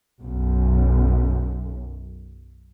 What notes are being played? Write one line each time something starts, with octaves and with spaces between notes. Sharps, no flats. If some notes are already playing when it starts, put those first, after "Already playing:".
B1 F#2